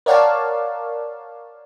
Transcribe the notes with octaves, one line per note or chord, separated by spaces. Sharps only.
A#4 C#5 D5 F5 F#5 A5